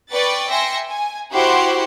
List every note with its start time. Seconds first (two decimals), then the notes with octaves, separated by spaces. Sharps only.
0.12 B4 D5 G5 C#6 A6
0.50 E5 G5 G#5 C6 A#6 C#7
0.89 G#5
1.34 E4 F#4 G4 C5 F#5 C6